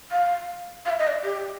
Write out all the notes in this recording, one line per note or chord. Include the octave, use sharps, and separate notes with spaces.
F5
F5
E5
D#5
D5
G4